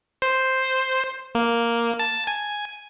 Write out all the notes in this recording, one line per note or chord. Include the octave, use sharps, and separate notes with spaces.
C5
A#3
A5
G#5